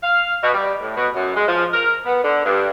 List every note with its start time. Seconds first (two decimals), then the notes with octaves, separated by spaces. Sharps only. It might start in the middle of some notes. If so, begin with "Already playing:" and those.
0.03 F5
0.42 B2
0.54 G3
0.81 A2
0.96 B2
1.15 F#2
1.36 G#3
1.47 F3
1.72 A#4
2.05 B3
2.23 D3
2.44 G2